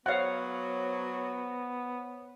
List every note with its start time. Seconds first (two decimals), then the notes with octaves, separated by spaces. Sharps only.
0.06 F#3 B3 C5 C#5 F5 F#5